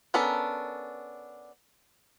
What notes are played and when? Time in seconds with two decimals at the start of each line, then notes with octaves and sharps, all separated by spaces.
0.14 B3 C#4 D4 A4 A#4